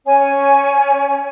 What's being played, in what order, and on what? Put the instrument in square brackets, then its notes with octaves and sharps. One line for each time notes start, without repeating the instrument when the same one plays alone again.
[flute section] C#4 C#5 G#5